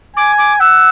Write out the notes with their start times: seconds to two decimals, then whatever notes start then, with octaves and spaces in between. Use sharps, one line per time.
0.16 G#5 D6
0.38 D6
0.60 F#5 E6